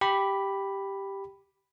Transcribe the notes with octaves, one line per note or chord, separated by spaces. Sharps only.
G4 B5